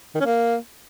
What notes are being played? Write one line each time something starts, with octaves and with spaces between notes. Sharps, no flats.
D#3
C#4
A#3